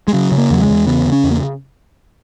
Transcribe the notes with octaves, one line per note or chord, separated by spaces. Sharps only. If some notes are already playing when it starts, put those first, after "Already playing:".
G#3
C#3 F#3
C#3
A#3
E2 F#3
G#3
E2
C#3 B3
C#3
C#4
E2
A#3